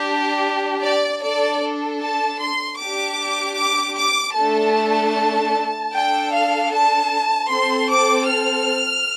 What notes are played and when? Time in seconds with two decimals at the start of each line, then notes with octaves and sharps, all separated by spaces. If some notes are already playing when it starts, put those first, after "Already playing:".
Already playing: D4 G4
0.84 D5
1.22 D4 A4 D5
2.01 A5
2.41 C6
2.79 D4 G4 D6
3.58 D6
3.97 D6
4.36 A3 D4 A4 A5
5.93 D4 A4 G5
6.32 F5
6.71 A5
7.50 C4 A4 C6
7.89 D6
8.28 F6